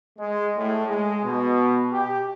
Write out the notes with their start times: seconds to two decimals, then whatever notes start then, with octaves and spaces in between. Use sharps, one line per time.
0.18 G#3
0.56 A2
0.87 G#3
1.24 B2
1.92 G4